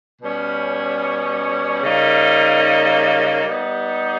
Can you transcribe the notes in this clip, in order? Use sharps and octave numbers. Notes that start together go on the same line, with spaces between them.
B2 G3 C#4
C#3 G3 A#3 D#4
G3 B3 D#4